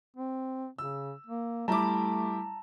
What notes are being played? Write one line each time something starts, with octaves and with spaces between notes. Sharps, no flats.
C4
C#3 E6
A#3
G3 A3 E4 A5 A#5 D6